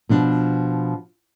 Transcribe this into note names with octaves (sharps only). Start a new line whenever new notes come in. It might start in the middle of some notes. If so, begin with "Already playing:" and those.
B2 F3 D4